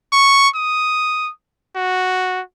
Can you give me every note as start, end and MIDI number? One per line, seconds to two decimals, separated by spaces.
0.13 0.49 85
0.55 1.31 87
1.76 2.41 66